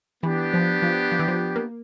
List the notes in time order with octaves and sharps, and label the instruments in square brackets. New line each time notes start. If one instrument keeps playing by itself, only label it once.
[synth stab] E3 [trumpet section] B3 D4 G4
[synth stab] F3
F3
F3
E3
F3
A#3